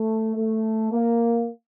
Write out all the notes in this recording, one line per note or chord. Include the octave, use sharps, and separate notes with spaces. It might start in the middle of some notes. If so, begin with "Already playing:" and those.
Already playing: A3
A3
A#3